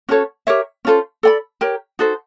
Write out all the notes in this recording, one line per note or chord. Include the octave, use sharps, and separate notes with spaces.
C#4 F#4 A4 C#5
G4 A#4 C#5 E5
C#4 F4 A4 C5
A4 D5 G5 B5
G4 A#4 C#5
D#4 F#4 A4 C5